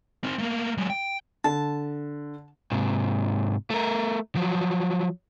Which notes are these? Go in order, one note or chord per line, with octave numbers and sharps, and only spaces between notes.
C4 D#4
A3 A#3
F#3 G#3
G5
D3 A5
G#2 C3
A3 A#4
F3 F#3